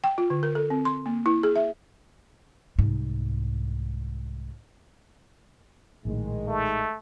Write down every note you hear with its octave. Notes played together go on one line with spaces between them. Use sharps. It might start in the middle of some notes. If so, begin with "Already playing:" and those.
G5
F4
D3
A#4
A4
C4
C6
A#3
E4
G#4
E5
C2 G#2
A#1 A2 D#3 G#3
A3